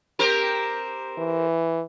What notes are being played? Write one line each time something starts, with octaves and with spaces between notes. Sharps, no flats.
C4 G4 A#4
E3